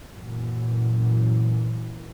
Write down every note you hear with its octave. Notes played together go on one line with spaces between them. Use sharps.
F#2 A#2 E3